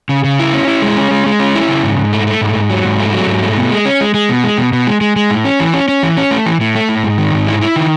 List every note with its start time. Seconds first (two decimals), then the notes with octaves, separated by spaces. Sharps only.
0.09 C#3
0.24 C#3
0.39 E4
0.53 C#4
0.67 E4
0.82 G#3
0.97 C#4
1.11 G#3
1.26 G#3
1.40 C#4
1.55 E4
1.68 C#3
1.83 G#2
1.98 G#2
2.13 A3
2.27 A3
2.41 G#2
2.55 G#2
2.70 F#3
2.85 G#2
3.00 A3
3.14 F#3
3.27 G#2
3.43 A3
3.56 B2
3.71 G#3
3.85 C#4
4.01 G#3
4.14 G#3
4.29 B2
4.44 G#3
4.58 B2
4.73 B2
4.87 G#3
5.01 G#3
5.16 G#3
5.30 A2
5.45 C#4
5.60 E3
5.74 C#4
5.88 C#4
6.03 E3
6.17 C#4
6.31 A3
6.46 E3
6.61 A2
6.75 A3
6.89 A2
7.04 G#2
7.18 D#3
7.33 G#2
7.47 E4
7.61 E4
7.76 D#3